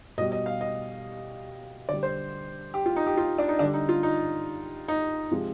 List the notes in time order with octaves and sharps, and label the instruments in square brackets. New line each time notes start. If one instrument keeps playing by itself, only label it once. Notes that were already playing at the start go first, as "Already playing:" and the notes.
[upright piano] B2 D#5
G3
D#5
F5
D#5
D3 G3 D5
C5
G4
F4
D#4
G4
F4
D4
D#4
D3 G3 D4
D#4
F4
D#4
D#4
C3 F3 G#3